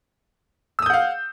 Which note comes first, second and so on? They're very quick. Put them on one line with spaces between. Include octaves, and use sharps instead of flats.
E6 D#6 G6 F#5 F5